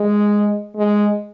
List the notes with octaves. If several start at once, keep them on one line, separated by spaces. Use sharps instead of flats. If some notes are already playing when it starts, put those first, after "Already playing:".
Already playing: G#3
G#3